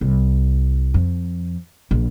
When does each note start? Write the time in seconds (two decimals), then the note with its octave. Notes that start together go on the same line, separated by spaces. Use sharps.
0.01 C2
0.94 F2
1.91 A#1